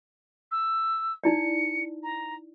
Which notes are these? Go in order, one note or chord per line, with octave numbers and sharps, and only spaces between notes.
E6
D#4 E4 D5 C#7
A#5